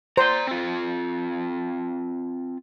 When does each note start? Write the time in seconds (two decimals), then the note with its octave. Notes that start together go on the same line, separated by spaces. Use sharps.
0.17 C5 D5 A#5
0.47 C4 F4